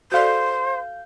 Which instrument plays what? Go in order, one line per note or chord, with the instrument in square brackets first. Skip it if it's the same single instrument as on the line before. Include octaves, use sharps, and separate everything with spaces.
[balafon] F#4 A4 D5 [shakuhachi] C5 [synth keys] F5 G6